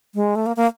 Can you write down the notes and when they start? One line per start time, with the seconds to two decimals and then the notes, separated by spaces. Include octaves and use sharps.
0.15 G#3
0.35 A3
0.46 A#3
0.56 A#3